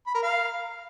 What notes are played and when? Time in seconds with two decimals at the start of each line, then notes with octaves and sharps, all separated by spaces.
0.07 B5
0.15 A#4
0.23 F5